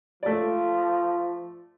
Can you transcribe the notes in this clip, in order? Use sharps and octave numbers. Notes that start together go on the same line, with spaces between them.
F3 A3 D5